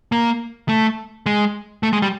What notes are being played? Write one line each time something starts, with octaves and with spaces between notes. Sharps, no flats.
A#3
A3
G#3
A3
G#3
G3